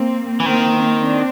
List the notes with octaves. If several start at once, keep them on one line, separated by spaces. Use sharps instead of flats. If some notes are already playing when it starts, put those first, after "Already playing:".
Already playing: A#3 C4
E3
D#3 A#3 C4
C4 D4